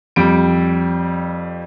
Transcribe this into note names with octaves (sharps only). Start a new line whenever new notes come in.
F2 G3 D7